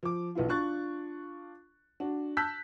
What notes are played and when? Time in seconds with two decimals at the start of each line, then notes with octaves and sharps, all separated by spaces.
0.03 F3 D6
0.35 B1 B3 E4 F4
0.49 D4 F4 C#6 F#6 A6
2.00 D4 F#4
2.37 A5 E6 F#6 G6 B6